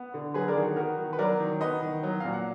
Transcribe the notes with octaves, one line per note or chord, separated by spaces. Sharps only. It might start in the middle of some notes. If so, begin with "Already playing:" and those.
Already playing: B3
D3
F#3 G#4 B4
A#4 D5
D#3 G#4
F#4
B3 F#4 A#4
D#3
B4
F#3 A#4 D5
D#3
B3 B4 D#5
D#3
F#3
A#2 F5
F#5